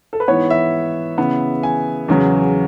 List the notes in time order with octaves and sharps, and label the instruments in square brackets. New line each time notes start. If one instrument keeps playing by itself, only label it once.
[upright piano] A4
B4
G#2 E3 B3 C#5
E5
C#3 E3 B3
G#5
E2 C#3 F#3